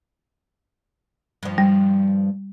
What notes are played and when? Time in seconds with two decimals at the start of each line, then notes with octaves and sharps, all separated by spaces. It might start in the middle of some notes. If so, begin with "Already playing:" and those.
1.43 G2 F3
1.58 G3